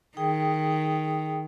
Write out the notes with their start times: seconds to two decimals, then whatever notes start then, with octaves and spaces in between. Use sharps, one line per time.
0.17 D#3 G#4 G5 D#6